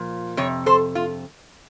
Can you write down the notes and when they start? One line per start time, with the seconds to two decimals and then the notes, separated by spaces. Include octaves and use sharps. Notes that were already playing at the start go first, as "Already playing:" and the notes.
Already playing: A#2 F3
0.37 F2 C3 C#5
0.66 A4 C5
0.95 F4